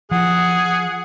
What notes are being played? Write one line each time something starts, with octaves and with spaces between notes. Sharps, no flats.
F3 G#4 F#5